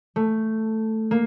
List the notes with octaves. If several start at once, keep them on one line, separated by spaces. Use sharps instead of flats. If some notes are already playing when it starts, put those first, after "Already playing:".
A3
A#3